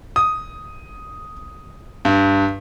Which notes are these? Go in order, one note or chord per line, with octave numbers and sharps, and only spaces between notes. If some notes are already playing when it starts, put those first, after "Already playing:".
D#6
G2